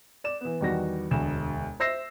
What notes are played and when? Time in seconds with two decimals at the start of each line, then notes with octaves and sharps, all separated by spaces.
0.24 D5 E7
0.41 E3 B3
0.61 E2 D#3 G3 F#4 A#6
1.11 E1 D2 E7
1.80 C5 E5 E6 A#6 C7 E7